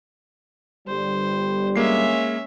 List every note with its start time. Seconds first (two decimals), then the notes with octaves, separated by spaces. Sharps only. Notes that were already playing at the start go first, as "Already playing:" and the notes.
0.87 G1 G3 C5
1.76 G#3 A#3 C#4 E5 C7